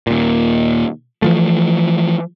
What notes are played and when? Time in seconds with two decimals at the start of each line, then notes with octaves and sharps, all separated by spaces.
0.07 D#2 A#2
1.22 E3 F3 A3